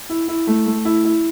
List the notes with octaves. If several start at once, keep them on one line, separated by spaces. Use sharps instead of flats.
E4
E4
A3
A3
E4
E4